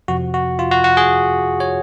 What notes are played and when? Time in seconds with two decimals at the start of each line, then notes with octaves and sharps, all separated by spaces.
0.08 F2 C3 F3 F#4
0.34 F#4
0.59 F4
0.71 F#4
0.84 F#4
0.97 G#4
1.60 C#5